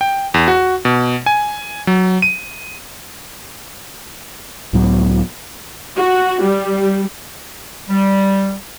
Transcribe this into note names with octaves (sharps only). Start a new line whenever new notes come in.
G5
E2
F#4
B2
G#5
F#3
D#7
C#2 A2 F#3 B3
F#4
G3
G3